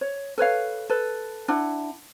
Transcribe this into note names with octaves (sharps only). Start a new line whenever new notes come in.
C#5
A4 B4 C#5 F5
A4 B4
D4 E4 F#5